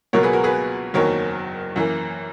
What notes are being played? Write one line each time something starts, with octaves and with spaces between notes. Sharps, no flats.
C#2 B2 F#3 A#3 A#4 C#5
G#4 B4
F#4 A#4
G#4 B4
F#1 E2 D#3 F#3 A#4 C#5
F#2 E3 A#3